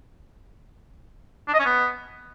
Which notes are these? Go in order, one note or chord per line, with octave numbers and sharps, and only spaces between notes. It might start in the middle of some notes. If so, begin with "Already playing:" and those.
D4
D#5
C#4
B3